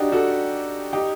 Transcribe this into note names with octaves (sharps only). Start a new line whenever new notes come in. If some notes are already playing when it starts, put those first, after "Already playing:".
Already playing: D4 D#4 F#4 G4
F#4 A4
D#4 G4